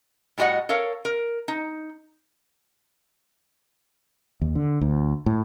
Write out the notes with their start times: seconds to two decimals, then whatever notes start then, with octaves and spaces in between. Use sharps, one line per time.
0.38 A2 G3 F#4 D#5 F#5
0.69 A4 A#4 C#5 F5
1.05 A#4
1.48 D#4
4.41 D#2
4.55 D3
4.81 D2
5.26 A2